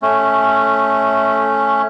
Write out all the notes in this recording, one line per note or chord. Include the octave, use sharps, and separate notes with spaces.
A3 C#4